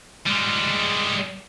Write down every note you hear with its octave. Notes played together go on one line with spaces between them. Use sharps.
G3 G#3